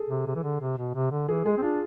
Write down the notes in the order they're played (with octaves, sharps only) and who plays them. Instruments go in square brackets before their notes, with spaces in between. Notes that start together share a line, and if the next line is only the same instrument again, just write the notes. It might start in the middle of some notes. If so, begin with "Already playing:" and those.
Already playing: [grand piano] G#4 A4
[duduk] C3
C3
E3
D3
C3
B2
C3
D3
[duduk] E3 [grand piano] G#4
[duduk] G#3 [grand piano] G#4
[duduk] C4
[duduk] D4 [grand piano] F4